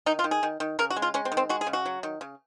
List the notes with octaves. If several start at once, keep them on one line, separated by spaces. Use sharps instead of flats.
D#3 D#4
F4
D#3
G#4
D#3
D#3
C#3 A#4
F#4
G#3
F4
G#3 C#4
C4
D#3
C4
G#3 F#4
G#4
C#3
F#4
F#3
D#3
C#3